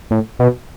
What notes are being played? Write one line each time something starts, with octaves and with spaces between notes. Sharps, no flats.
A2
B2